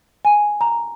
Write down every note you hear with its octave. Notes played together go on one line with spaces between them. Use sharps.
G#5
A#5